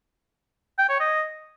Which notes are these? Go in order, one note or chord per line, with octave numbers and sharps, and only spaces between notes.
G5
C#5
D#5